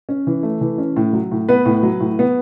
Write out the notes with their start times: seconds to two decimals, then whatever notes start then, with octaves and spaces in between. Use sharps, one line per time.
0.09 C#4
0.27 E3
0.43 A3
0.61 E3
0.78 C#4
0.96 A2
1.13 F#3
1.32 A2
1.49 B3 B4
1.65 A2
1.83 F#3
2.00 A2
2.19 B3